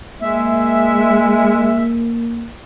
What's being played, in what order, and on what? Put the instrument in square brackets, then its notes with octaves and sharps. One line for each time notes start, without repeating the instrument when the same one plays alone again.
[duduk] G#3 [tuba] A#3 [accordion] E5